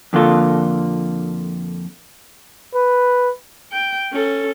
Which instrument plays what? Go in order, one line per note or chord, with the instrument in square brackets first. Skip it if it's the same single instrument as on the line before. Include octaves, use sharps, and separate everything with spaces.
[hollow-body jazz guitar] F2 D3 A#3 F4 A4
[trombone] B4
[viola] G5
C#4 A4